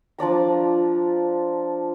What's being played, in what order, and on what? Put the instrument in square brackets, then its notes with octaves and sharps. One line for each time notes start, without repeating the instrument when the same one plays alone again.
[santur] F3 D4 D5 A#5